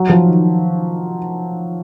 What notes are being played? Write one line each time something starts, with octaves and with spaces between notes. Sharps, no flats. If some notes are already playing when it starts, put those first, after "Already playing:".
Already playing: F#3
F3
D#3